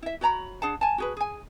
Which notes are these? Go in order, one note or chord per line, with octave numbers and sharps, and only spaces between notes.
E4 E5
F#4 C#5 A#5 B5
D4 G#4 F#5 A5
G#5 A5
F#4 G#4 B4
G#4 G#5